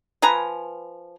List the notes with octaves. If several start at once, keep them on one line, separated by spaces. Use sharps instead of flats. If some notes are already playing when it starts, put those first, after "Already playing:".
F3 B4 G#5 A#5